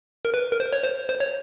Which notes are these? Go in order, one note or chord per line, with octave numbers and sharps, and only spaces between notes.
A#4
B4
A#4
C5
C#5
C5
C5
C#5